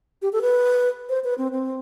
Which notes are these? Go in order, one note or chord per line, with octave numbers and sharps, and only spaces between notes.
G4
A4
B4
C5
B4
C4
C4